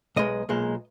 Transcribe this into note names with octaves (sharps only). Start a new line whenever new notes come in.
B1 B2 G#3 D#5
B1 A#2 G#3